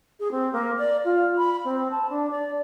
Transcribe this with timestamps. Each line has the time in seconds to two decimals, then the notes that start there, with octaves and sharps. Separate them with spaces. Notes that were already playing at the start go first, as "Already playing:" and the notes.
0.20 G#4
0.31 C4
0.53 A#3
0.78 D5
1.04 F4
1.38 B5
1.65 C4
1.91 A5
2.09 D4
2.31 D5